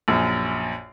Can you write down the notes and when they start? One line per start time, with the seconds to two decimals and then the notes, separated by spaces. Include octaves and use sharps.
0.08 A#1 F#2